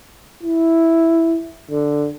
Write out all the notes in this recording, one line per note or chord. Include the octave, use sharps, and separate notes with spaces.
E4
D3